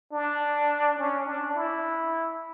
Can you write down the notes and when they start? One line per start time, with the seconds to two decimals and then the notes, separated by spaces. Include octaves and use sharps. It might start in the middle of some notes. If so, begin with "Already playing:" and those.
0.12 D4
0.98 C#4
1.26 D4
1.55 E4